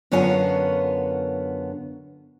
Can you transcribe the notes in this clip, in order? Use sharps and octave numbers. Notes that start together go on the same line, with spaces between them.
F#2 D3 B3 F4 C#5 G#5